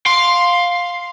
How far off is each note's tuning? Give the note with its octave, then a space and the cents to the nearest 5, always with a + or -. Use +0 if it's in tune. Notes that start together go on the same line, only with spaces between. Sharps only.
F5 +10 C6 +0